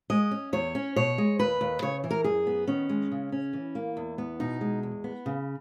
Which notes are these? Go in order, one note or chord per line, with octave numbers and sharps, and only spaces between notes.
G#3 D#5
C#4
E2 C#5
C#4
B2 C#5
G#3
D#2 B4
D#2
C#3 C#5
E3
A#4
F#2 G#4
B3
D#3 C#4
G#3
C#3
C#4
E3
A#3
E2
B3
B2 D#4
G#3
E2
B3
C#3